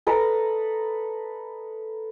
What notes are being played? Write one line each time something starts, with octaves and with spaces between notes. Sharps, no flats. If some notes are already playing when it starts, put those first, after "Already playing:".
A4 B4 D#5 A#5